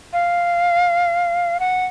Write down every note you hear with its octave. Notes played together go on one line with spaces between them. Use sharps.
F5
F#5